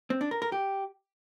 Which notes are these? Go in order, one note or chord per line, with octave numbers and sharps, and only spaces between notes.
C4
D4
A#4
A#4
G4